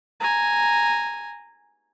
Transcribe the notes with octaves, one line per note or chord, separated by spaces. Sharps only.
G#5 A#5